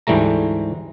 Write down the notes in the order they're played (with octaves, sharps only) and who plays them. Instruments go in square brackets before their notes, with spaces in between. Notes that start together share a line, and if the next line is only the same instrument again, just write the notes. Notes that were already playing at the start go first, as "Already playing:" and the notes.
[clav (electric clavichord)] D2 G#2 E3 G3 A3 A#5